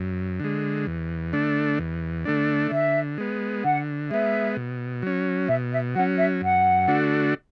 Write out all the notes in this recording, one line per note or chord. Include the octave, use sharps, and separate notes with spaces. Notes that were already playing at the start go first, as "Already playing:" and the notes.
Already playing: F#2
D3 G#3
E2
D3 A3 D4
E2
D3 A3 D4
D3 E5
G#3 B3
D3 F#5
G#3 B3 E5
B2
F#3 C#4
B2 E5
E5
F#3 C#4 F#5
E5
F#2 F#5
D3 A3 D4 F#4